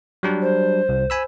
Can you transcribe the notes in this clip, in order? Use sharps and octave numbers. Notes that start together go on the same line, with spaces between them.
F#3 G3 D4
C5
C2
G#5 B5 E6